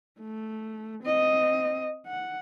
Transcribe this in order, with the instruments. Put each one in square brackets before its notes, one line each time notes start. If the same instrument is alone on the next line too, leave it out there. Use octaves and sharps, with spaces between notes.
[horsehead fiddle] A3
C4 D#5
F#5